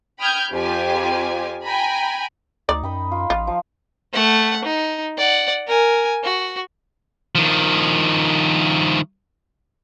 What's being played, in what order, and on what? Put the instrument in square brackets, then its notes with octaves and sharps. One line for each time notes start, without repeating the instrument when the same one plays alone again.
[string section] G5 B5 D#6 F6 G6 G#6
F2 F4 G4 G#5
G5 G#5 A#5 B5
[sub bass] D2 [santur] D#4 [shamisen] D5
[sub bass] F#2 [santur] G5 B5 D#6
[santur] F4
[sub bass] A1 [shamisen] F4 [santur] F5
[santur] F3
[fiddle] A3 F#5
D#4
D5 F#5
A#4 G#5
F#4
[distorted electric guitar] D#3 F3